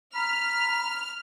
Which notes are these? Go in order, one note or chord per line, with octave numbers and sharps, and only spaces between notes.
A#5 B5 F6